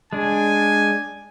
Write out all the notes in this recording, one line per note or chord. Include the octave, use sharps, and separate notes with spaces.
G#3 D4 G#5